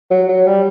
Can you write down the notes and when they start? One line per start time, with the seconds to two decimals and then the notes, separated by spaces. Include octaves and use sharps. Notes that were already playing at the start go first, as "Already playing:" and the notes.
0.11 F#3
0.29 F#3
0.46 G3